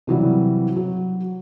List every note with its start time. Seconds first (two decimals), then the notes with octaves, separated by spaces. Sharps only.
0.07 C3 E3 F#3 G3
0.76 F#3